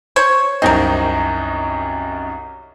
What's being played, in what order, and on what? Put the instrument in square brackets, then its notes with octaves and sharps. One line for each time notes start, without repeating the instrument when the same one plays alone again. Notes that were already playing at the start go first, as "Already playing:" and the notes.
[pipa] C5 C#5
[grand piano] C2 F#2 D#4 [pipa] C4 A#4